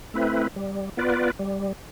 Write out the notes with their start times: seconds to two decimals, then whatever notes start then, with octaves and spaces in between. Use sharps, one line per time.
0.14 A3 C4 E4 B4
0.56 G3
0.97 B3 F4 B4 D5
1.39 G3